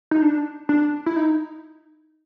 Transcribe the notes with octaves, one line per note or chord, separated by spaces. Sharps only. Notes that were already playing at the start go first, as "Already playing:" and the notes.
D#4
D4
D4
E4
D#4